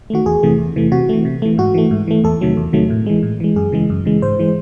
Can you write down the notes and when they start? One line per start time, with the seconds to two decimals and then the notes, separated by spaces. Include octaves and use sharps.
0.10 D#3 A3 F#4
0.26 E2 G#4
0.43 C3 E3 A3
0.59 E2
0.76 C3 E3 A3
0.92 C3 F#4
1.09 E3 A3
1.25 C3
1.42 E3 A3
1.58 G#2 F#4
1.74 E3 A3
1.91 G#2
2.08 E3 A3
2.24 E2 A4
2.41 C3 D#3 F#3 A3
2.57 E2
2.73 C3 D#3 F#3 A3
2.90 A2
3.06 E3 G#3
3.23 A2
3.40 E3 G#3
3.56 F#2 G#4
3.72 C#3 E3 G#3
3.90 F#2
4.05 C#3 E3 G#3
4.22 G#2 C5
4.39 E3 G#3